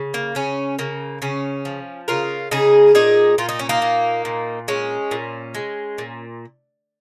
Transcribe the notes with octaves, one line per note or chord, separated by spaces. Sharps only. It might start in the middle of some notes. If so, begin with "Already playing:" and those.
Already playing: C#3
A#3
C#3 C#4
C#3 A#3
C#3 C#4
F3
C#3 F4 A#4
C#3 D#4 G#4
A#2 D#4 G#4
A#2 F4
D#4
C#4
A#3 D#4
A#2
A#2
G#3 C#4
A#2
G#3
A#2